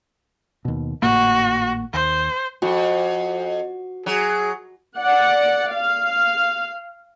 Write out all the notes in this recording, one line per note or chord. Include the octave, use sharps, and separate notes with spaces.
D#2 B2
G#1 A2 A#3 F#4
D#2 C5
F2 F#4
F#3 G#4
D5 F#5
F5